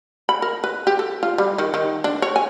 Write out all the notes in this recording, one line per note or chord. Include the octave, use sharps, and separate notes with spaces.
B5
A#4
B4
G4
A4
F4
G3
D#3
D#3
D4
C#5
G#5